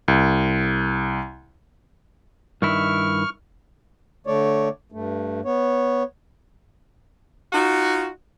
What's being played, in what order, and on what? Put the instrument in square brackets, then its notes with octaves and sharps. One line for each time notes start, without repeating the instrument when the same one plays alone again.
[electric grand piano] C2
[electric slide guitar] G2 D#3 E4 [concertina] C#6 F6
[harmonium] D3 A3 C#5 D5
G2 A3
B3 C#5
[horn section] D#4 F4 F#4